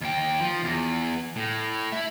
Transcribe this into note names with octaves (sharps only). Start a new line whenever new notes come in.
D#2 G5
F3
E2
A2
E4 E5